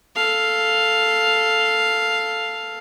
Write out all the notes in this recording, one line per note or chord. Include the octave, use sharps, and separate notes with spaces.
A4 F5